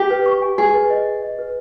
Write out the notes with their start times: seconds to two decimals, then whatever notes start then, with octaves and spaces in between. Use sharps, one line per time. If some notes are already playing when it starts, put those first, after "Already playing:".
Already playing: G4
0.10 B4
0.26 C#6
0.42 G#5
0.58 G#4 G#5
0.74 B4
0.90 D#5
1.07 G#5
1.22 D#5
1.39 B4